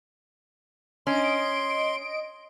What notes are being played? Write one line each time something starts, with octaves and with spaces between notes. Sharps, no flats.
C#4 D#5 C6 D7